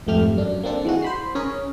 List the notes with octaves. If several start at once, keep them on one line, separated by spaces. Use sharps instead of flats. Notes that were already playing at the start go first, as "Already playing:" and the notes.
G#1 F2 A3 G4 F6
F#2 D4
A#3 C4 D4 A4
E3 G#3 F#4
C5 B5 C7
C#4 G#4 A#4